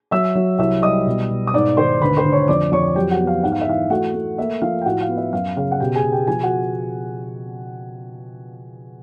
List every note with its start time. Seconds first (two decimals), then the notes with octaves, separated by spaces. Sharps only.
0.11 F#3 E5 E6
0.35 F#3
0.59 C2 E5 E6
0.82 G3 D#5 D#6
1.07 B2
1.30 B2
1.47 D#6
1.54 G#2 D5 D6
1.77 D#3 C5 C6
2.01 D2 B4 B5
2.17 C5 C6
2.25 D2
2.32 C#5 C#6
2.48 F2 D5 D6
2.72 F2 C#5 C#6
2.96 F#3 G4 G5
3.11 F#4 F#5
3.19 B3
3.27 F5
3.43 G#2 F#5
3.52 F5
3.61 E5
3.66 E3 F5
3.90 A3 F#4 F#5
4.14 A3
4.38 A#3 E5
4.62 F3 F5
4.81 G5
4.86 A2 F#4 F#5
5.01 F5
5.09 B3
5.17 E5
5.32 F#2 F5
5.56 C#3 F5
5.71 F#5
5.80 B2 G4 G5
5.95 G#4 G#5
6.03 B2
6.12 G4 G5
6.27 F3 G#4 G#5
6.43 F#4 F#5